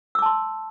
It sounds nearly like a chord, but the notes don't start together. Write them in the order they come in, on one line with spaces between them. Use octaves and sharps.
E6 D6 A5 C6